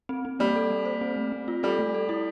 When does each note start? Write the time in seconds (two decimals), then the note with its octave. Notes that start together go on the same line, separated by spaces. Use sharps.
0.09 C4
0.25 C4
0.39 G3 A#3
0.56 A4
0.71 A#3
0.85 C5
1.01 C4
1.16 A3
1.32 C4
1.48 F4
1.63 G3 A4
1.79 A3
1.94 A4
2.09 E4